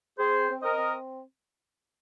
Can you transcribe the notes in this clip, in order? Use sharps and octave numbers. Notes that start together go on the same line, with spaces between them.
C4 G#4 C5
C4
A#4 D#5
C4